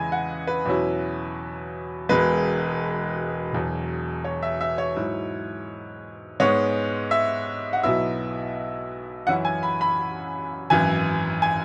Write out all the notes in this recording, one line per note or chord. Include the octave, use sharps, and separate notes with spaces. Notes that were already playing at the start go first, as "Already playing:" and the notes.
Already playing: E2 C#3 E3 G#3 E4 G#5 B5
F#5
B4
E2 B2 F#3 C#4 E4
E1 E2 B2 G#3 B4
E1 E2 B2 F#3
C#5
E5
E5
C#5
G#2 F#3 E4
G#2 G#3 B3 C#5
E5
F#5
B1 B2 F#3 B3 E4 E5
F#2 E3 C#4 E4 F#5
G#5
B5
B5
G#1 F#2 E3 G#5
G#5